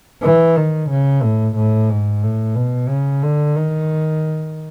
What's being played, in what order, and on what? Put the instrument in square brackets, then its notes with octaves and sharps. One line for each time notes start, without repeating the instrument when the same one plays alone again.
[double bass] E3
D#3
C#3
A2
A2
G#2
A2
B2
C#3
D3
D#3